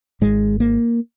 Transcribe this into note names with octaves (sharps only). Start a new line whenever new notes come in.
G#1 G#2 G#3
A#3